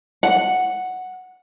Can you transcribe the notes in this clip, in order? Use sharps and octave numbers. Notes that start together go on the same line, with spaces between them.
F#5